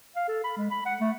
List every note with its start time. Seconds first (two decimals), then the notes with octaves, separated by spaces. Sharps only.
0.16 F5
0.28 A4
0.44 B5
0.57 G#3
0.71 B5
0.85 F#5
1.00 A3